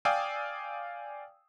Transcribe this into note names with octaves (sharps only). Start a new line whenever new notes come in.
D5 F5 G5 G#5 D#6 E6